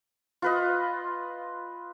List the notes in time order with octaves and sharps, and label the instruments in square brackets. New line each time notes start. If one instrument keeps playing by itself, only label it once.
[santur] F4 B4 D#5